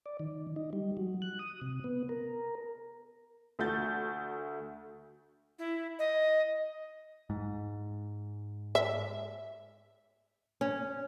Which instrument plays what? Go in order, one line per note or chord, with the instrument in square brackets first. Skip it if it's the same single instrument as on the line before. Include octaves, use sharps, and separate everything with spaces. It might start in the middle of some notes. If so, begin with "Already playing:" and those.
[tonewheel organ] D5
D#3
D#4
G3
F#3
F#6
D#6
C3
B3
A#4
[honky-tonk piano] D2 A3 F#4 G6 A6
[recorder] E4
D#5
[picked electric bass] G#2
[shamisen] E5
[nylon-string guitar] C#4